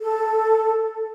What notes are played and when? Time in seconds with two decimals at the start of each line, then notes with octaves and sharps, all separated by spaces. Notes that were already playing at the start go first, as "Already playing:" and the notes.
0.01 A4